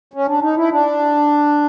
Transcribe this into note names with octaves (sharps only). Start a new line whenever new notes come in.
C#4
D4
D#4
E4
D4